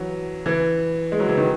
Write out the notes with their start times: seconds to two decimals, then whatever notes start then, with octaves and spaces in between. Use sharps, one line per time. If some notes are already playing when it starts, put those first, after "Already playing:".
Already playing: E3 F#3
0.46 E3
1.12 G#3
1.20 F#3
1.29 E3
1.37 D#3